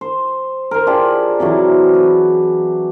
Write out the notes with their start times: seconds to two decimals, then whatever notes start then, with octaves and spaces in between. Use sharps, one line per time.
0.01 C5
0.71 A#4 C5
0.87 D4 F4 G4 G#4
1.40 C3 E3 F#3
1.94 B4